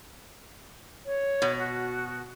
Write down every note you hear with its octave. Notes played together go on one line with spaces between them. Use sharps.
C#5
B2
F#4